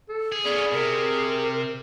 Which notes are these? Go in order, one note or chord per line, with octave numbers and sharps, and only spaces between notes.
A4
G#4
B3 C#4 G#4 D5
C3 A#4